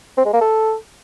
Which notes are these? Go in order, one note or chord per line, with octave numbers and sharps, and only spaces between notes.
C4
G#3
A#3
A4